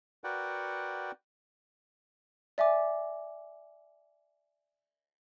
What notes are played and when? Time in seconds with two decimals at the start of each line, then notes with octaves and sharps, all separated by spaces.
0.24 F#4 A#4 B4 D5 F#5 G5
2.58 D5 E5 G#5 D6